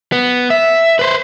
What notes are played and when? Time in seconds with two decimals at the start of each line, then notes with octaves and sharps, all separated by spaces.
0.12 B3
0.50 E5
0.99 B4 C5